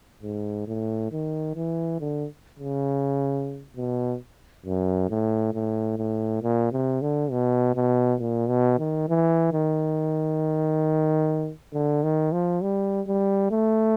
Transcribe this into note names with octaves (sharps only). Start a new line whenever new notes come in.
G#2
A2
D#3
E3
D3
C#3
B2
F#2
A2
A2
A2
A#2
C3
D3
B2
B2
A#2
B2
D#3
E3
D#3
D3
D#3
F3
G3
G3
A3